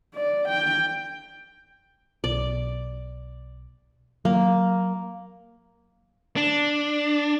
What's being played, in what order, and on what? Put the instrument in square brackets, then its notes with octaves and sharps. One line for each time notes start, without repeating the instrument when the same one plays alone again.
[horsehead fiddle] D5
G5
[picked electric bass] B1 [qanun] D5
[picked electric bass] F#3 [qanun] A#3
[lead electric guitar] D4